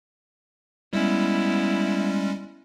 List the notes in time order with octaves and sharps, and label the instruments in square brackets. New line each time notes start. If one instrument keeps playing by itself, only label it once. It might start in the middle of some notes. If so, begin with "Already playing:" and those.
[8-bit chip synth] G3 G#3 C#4 [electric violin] B3 E4